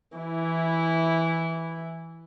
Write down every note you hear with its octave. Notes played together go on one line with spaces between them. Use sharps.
E3 E4